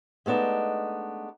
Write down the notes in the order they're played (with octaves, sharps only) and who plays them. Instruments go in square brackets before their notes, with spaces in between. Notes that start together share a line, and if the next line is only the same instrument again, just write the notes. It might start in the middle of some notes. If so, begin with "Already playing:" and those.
[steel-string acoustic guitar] G#3 A3 B3 D4 D#4